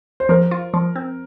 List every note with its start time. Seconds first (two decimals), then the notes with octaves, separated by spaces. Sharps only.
0.20 C5
0.29 F3 A#4
0.51 F4
0.74 F3
0.96 C4